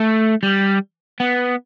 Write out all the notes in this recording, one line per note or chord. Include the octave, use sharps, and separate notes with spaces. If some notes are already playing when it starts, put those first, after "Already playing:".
Already playing: A3
G3
B3